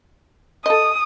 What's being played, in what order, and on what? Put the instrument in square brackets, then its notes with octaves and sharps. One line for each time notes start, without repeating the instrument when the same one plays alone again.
[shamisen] A4 D#5 [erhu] D#6